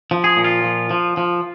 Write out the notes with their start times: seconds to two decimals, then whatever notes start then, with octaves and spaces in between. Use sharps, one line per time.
0.11 F3
0.24 G#4
0.37 A#2
0.44 F4
0.64 F3
0.91 F3
1.17 F3